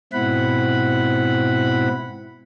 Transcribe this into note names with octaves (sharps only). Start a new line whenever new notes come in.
G#2 B2 C4 E4 F#5 B5